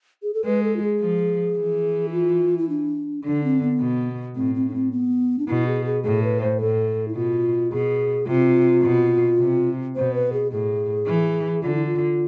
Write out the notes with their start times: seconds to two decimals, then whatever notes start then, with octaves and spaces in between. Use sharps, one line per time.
0.23 G#4
0.34 A4
0.45 G#3 B4
0.63 A4
0.76 F4
0.83 G#4
1.01 F3
1.57 E3
2.08 E4
2.12 F4
2.58 E4
2.69 D4
3.25 D3 D4
3.44 C4
3.62 B3
3.81 B2
4.36 A2 C4
4.55 C4
4.69 D4
4.74 C4
4.92 B3
5.39 D4
5.48 B2 E4
5.67 G#4
5.85 G#4
6.04 A2 G#4
6.23 B4
6.42 C5
6.60 A2 A4
7.08 E4
7.16 B2 F4
7.72 B2 G#4
8.28 C3 F4
8.84 B2
9.39 C3
9.96 B2 C5
10.14 B4
10.33 G#4
10.52 A2 G#4
11.07 E3
11.63 D3 F4
11.75 E4
11.86 F4